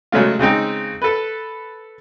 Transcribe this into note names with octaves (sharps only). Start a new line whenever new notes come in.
C#3 F#3 G#3 A3 F4
C#3 G#3 C4 D#4
A4 B4